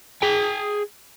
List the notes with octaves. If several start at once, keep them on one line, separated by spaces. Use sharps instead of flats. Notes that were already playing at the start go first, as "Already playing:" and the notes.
G#4 G5